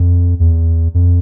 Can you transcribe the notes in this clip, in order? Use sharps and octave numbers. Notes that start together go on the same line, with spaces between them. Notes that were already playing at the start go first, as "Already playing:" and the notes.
Already playing: F2
E2
F2